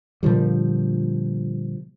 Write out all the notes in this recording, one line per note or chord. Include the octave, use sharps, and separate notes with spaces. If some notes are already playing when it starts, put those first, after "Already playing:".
A#2 D3 F3 G3